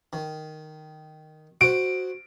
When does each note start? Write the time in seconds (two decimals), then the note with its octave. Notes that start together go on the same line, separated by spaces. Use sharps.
0.13 D#3
1.61 F#4 C5 D7